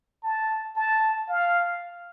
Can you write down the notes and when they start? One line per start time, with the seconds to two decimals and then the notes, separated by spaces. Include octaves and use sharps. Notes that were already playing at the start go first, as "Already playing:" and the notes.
0.23 A5
0.76 A5
1.29 F5